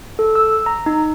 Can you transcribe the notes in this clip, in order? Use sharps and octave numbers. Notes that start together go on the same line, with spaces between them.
A4
E6
A#5
D#4